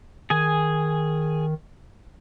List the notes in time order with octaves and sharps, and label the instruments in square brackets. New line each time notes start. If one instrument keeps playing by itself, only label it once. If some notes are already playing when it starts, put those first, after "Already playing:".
[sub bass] D#3 [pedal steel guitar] G#4 G#5